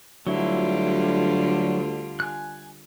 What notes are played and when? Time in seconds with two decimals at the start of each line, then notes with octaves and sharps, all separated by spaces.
0.27 D2 D3 F#3 G3 E4 F4
2.20 G#5 F#6